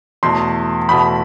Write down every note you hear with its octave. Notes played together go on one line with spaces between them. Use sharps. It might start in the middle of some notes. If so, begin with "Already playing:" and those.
E2 B2 A3 C6
E2 B2 A3 B5